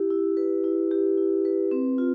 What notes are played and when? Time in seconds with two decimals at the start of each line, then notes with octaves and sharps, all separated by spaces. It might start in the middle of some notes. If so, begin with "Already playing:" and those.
Already playing: E4 G4
0.10 E4
0.37 B4
0.64 E4
0.91 G4
1.18 E4
1.45 B4
1.71 C4
1.98 F4